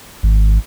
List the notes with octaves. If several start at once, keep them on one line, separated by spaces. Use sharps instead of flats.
G#1